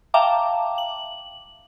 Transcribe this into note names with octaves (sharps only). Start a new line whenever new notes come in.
E5 F5 G5 A5 A#5 D6
F#7